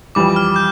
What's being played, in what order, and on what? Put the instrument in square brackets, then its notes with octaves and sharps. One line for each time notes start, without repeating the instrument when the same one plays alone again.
[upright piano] F2 E3 G3 [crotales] D6
[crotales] F6
G6